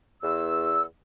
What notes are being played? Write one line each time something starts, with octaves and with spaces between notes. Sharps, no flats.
E2 E6